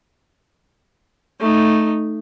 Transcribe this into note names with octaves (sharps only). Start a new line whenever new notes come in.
A3 D#4